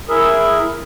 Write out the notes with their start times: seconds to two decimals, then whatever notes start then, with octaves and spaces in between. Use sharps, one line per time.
0.09 E4 G#4 A#4 E5